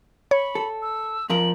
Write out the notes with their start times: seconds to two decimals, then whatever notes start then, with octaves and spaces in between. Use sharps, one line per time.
0.31 C#5 B5
0.55 A4
0.82 E6
1.30 F2 F3 A#4 F#7